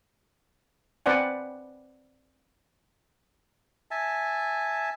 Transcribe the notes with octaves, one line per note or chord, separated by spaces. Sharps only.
C4 B4 C5 D5 F#5 G#5
E5 G#5 A5